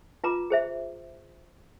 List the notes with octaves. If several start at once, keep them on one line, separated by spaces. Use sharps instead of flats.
F4 B4 A#5 D6
G#4 C5 E5